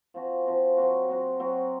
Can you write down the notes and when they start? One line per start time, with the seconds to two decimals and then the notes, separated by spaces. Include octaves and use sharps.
0.14 F3 C4 F#4
0.45 F3 C4 F#4
0.77 F#3 C4 F#4
1.08 F#3 C4 F#4
1.40 F#3 C4 F#4